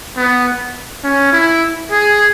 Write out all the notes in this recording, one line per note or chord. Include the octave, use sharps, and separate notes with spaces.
B3
C#4
E4
G#4